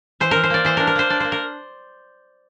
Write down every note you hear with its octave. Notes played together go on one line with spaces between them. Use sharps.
E3 C5
E3 A#4
C5
A#3 D5
E3 C5
D4 A#4
A#4
A#3 C5
D4 D5
A#3 C5
A#4